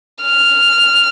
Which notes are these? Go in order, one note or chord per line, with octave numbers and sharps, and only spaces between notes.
F6